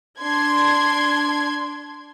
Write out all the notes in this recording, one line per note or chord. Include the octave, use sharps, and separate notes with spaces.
D4 C6 G#6